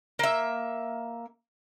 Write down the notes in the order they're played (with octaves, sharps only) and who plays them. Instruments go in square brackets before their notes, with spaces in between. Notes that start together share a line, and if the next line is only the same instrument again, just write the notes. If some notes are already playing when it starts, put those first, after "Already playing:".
[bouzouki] A#3 E5